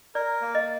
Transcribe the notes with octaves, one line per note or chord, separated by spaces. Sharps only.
A#4 D5
A#3
D#5